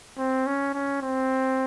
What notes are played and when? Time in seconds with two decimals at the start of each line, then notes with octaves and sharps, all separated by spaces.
0.18 C4
0.47 C#4
0.74 C#4
1.02 C4